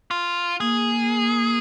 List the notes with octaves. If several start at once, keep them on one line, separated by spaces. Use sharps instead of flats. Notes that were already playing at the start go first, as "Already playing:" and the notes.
F4
A#3 G#4